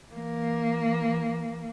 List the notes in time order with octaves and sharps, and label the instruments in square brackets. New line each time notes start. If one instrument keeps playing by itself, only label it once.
[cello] E3 A#3